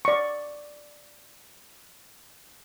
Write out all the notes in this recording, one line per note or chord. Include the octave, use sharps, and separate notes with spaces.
D5 C#6